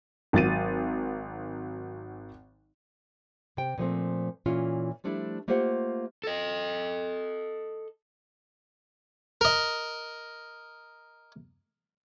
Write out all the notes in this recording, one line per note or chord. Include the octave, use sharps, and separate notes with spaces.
G#1 F#3 A6 D#7
C3 G5
A#2 F3 A3 C4
A#2 E3 C#4 F4
F3 G3 A3 D4 E4
A3 A#3 F4 G4 C5 F#5
A4 D#5
A#4 D#5